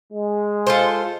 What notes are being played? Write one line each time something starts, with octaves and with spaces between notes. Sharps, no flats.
G#3
F4 A4 C5